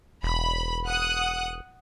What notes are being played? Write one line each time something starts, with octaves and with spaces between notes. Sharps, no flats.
E1 B5
F#5 D#6 F#6